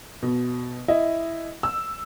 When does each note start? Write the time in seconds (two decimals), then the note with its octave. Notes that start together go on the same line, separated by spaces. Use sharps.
0.22 B2
0.88 E4 D#5
1.63 E6